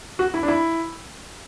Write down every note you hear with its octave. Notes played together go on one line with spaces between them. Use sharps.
F#4
E4
D4
E4